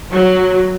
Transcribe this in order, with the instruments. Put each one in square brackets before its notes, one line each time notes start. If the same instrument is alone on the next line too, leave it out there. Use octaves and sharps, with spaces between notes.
[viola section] F#3